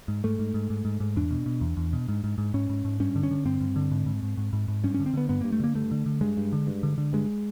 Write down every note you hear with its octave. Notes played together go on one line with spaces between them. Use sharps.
G#2
G#2 A3
G#2
G#2
G#2
G#2
G#2
E2 D4
B2
B2
E2
E2
B2
G#2
G#2
G#2
G#2 C#4
G#2
G#2
G2 C#4
D3
C#4
D3
G2 C4
G2
D3
G#2
G#2
G#2
G#2
G#2
G#2
G2 C#4
C#4
D3
C4
D3 B3
G2 B3
G2 A#3
A3
D3 A#3
G2 A3
D3
D3
G2 G#3
G2
D3
G2
D3
D3
G2 G#3